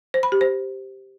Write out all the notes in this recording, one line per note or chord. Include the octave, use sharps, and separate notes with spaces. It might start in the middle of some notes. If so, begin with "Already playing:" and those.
C5
B5
G4
C5